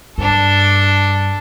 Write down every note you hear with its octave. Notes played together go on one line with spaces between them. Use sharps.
G2 D4 A4